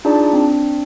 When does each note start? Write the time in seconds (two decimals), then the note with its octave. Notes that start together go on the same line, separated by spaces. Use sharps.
0.05 D4 D#4 F4 G#4 D5 A5
0.33 C4 D4